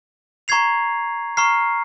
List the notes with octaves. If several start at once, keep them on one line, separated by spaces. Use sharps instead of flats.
A#5 C#6 G#6 C7 F7
A#5 C#6 F6 C7